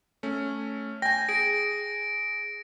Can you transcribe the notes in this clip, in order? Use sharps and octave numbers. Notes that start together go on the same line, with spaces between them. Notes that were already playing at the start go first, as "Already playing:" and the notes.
A3 C#4
G5 G#5 A#6
G#4 A#6 D7